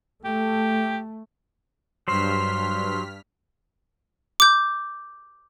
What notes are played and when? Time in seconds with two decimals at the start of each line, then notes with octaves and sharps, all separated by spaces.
0.25 A3 G4
2.08 G2 F#3 C5 C6 F6 B6
4.40 D6 G6